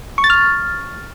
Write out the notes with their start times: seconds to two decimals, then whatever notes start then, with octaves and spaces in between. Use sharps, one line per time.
0.18 C#6
0.24 A6
0.30 F6